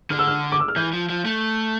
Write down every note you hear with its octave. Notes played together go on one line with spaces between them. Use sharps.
D3 F6
E6
F6
D6
E6
F6
E3 G6
F3
F3
A3